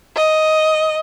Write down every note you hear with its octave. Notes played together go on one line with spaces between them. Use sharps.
D#5